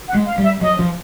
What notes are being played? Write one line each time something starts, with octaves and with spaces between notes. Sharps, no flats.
F#5
G#3
F5
G3
E5
F#3 D#5
F3